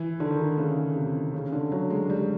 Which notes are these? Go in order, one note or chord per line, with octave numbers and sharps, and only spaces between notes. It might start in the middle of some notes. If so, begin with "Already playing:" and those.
Already playing: E3
D3
D#3
D3
C#3
C3
C#3
D3
F#3
G#3
G3